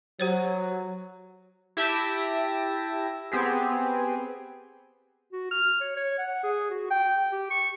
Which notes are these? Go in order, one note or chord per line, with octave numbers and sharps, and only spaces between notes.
F#3 G4 C5 C#5
E4 G4 E5 A5 A#6 D7
B3 C4 G4 G#4
F#4
F6
C#5
C#5
F#5
G#4
F#4
G5
G4
C#6